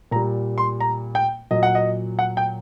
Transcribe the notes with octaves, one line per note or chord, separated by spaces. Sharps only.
A#2 G3 A#5
C6
A#5
G5
A#2 F#3 D#5
F#5
D#5
F#5
G5